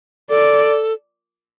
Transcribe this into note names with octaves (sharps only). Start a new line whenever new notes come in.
A4 D5